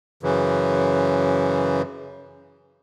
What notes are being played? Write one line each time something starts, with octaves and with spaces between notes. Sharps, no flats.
F#2 C#3 E3